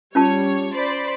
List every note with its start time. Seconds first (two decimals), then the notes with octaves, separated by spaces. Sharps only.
0.15 G3 C#4 F4 C#5 A5
0.74 C5 D5 B5